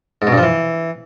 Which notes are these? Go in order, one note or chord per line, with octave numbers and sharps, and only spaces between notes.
G#2
B2
G2
F3
E3